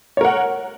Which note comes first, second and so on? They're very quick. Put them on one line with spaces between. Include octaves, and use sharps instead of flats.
C#5 A#4 F#5